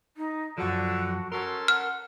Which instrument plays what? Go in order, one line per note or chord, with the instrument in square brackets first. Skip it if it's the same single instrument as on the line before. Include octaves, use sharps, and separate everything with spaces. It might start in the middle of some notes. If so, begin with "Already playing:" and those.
[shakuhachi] D#4
[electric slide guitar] F#2 F3 [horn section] D3 [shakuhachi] F#4
[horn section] C#4 A4 C6 [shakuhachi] F#4 [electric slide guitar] A#4
[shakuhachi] F#5 [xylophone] F6